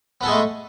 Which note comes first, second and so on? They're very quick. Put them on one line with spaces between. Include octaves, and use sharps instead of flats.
B3 A4 G#4 G#3 A3